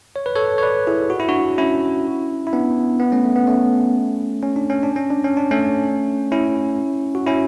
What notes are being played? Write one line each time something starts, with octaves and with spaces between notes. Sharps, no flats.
C#5
B4
A4 C#5
C#5
B4 D5
E4 G#4
F#4
E4
D4 F#4
C#4 E4
E4
B3 D4
B3
A3 C#4
A3
B3
A3 C#4
C#4
D4
C#4
D4
C#4
D4
C#4
D4
A3 C#4
C#4 E4
F#4
C#4 E4